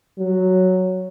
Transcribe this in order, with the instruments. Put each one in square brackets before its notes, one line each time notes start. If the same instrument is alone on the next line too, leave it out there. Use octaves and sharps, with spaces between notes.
[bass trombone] F#3